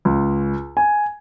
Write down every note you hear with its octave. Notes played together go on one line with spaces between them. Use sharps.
C#2
G#5